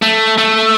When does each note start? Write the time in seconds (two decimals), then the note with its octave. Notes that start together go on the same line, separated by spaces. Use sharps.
0.02 A3
0.38 A3